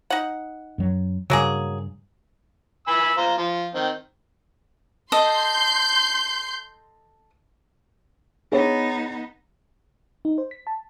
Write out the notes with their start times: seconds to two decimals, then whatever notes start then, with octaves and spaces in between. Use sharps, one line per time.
0.10 D#4 F#5
0.78 F#2 F#3
1.30 G2 C#3 F#3 A#3 G#4
2.88 G#5 B5 E6
3.17 F4 C5 A#5
3.38 F3
3.74 D#3 C4
5.12 A4 D#5 C6 G6 C7
8.52 B3 D#4 G#4 C#5
10.25 D#4
10.38 C5
10.51 B6
10.67 A5